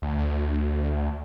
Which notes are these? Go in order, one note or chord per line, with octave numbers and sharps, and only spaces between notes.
D2